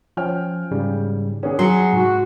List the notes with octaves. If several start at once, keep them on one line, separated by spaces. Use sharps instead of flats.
F3 C#4 G5 F6
G#2 C#3 G3
D#3 B3 C#4 D4 G#4
F#3 G#4 C6 C#7
G#2 F#4